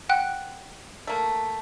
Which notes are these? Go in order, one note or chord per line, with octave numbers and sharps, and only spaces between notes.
F#5 G5 F#6
A3 A#3